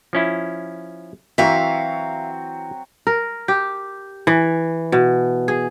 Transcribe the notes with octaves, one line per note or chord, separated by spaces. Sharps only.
F3 C#4 E4
E3 F#3 C4 E5 F5 A#5
A#4
G4
E3
B2
G#4